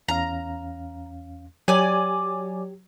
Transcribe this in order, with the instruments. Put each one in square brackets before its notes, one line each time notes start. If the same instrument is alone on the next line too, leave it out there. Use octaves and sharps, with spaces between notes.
[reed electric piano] E2 C#4 F5 [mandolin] A#5
[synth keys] F#3 C#5 [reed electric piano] G4 [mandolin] D5 G#5